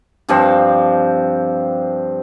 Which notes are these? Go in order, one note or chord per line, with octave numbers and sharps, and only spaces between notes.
G2 F3 C4